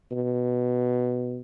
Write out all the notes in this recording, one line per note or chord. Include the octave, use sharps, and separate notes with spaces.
B2